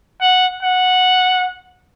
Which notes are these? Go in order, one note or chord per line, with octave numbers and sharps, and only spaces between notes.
F#5
F#5